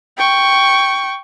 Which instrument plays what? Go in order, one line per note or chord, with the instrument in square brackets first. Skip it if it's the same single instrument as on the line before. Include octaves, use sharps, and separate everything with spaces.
[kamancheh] G5 C#6